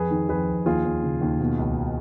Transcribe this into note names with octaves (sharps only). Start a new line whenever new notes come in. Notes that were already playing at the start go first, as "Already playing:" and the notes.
Already playing: F2 G#4 B4
D#3
F2 G#4 B4
F2
D#2 F4 G#4
D#2
C#3
D#2
B2
C#2